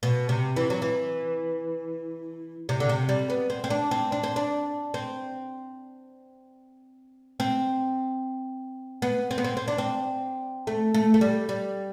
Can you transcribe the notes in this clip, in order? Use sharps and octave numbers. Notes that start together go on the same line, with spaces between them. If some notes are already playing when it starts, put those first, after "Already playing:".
B2
C3
E3
F#3
E3
C3
D3
C3
G3
B3
C4
C4
D4
C4
D4
C4
D4
C4
C4
B3
C4
B3
C4
C4
D4
C4
A3
A3
A3
G3
G3